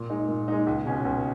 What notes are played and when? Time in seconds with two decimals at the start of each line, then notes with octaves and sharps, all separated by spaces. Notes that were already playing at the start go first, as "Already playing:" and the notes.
Already playing: A#2
0.10 G#3 D#4
0.28 A#2
0.48 G#3 D#4
0.67 C#2
0.86 B2 G#3 C#4 G#4
1.05 C#2